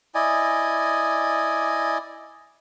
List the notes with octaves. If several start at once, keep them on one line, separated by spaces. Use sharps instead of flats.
E4 D5 D#5 G#5